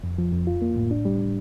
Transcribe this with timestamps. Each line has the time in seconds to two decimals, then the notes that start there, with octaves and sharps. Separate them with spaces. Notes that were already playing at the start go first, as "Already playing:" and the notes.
0.03 F2
0.18 F3
0.32 F2
0.47 F4
0.62 A#3
0.76 A2
0.91 D4
1.05 G3